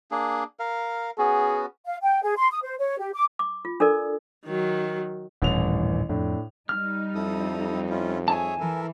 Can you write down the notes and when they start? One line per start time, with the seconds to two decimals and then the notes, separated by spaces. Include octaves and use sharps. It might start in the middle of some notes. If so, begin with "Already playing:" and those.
0.11 A#3 D4 G#4
0.59 A#4 F5
1.18 B3 C#4 F#4 G#4
1.85 F5
2.02 G5
2.23 G#4
2.37 C6
2.51 D#6
2.63 C5
2.79 C#5
2.99 G4
3.13 D6
3.39 D6
3.65 F4
3.80 D4 A4 A#4 D5
4.46 D#3 F#3
5.42 D#1 A1 G2 E3 F7
6.09 F2 A2 D4
6.69 G3 D#4 F6
7.15 F2 E4 A4 D#6
7.90 C#4 E4 F4
8.28 G#4 C#5 E5 G#5 A5
8.60 E3 A4 A#4